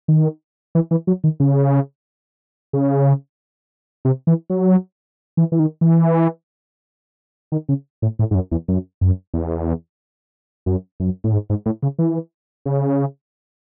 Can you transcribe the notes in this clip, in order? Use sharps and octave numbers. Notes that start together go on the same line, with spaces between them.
D#3
E3
E3
F#3
D#3
C#3
C#3
C3
E3
F#3
E3
E3
D#3
E3
D#3
C#3
A2
A2
G#2
F#2
E2
F#2
F#2
E2
F#2
F#2
A2
G#2
G#2
A2
C#3
E3
C#3